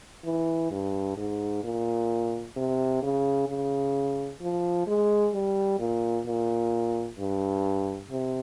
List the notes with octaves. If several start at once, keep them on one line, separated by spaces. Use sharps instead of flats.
E3
G2
G#2
A#2
C3
C#3
C#3
F3
G#3
G3
A#2
A#2
G2
C3